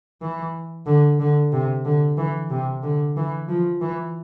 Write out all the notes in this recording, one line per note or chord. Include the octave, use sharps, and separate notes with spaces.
E3
D3
D3
C3
D3
E3
C3
D3
E3
F3
E3